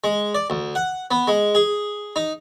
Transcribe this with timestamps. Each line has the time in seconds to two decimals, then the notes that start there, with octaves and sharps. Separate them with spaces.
0.04 G#3
0.35 D5
0.50 D2
0.75 F#5
1.11 B3
1.28 G#3
1.55 G#4
2.16 D#4